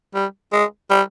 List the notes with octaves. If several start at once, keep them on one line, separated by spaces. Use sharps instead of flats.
G3
G#3
G3